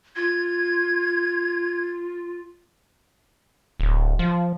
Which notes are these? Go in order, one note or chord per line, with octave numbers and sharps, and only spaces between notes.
F4 G#6
D1
F3